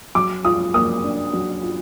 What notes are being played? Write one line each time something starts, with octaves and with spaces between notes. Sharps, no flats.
F#3 D6
F4 D#6
A#3 D#6
D4
F#3
F4